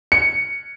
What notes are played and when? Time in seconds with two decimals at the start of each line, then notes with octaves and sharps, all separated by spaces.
0.12 C#7